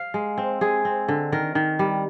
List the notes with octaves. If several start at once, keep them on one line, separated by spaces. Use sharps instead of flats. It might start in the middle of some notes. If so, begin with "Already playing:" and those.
Already playing: F5
G#3
C4
G#3 G#4
C4
D3
D#3 A#4
D#3
G3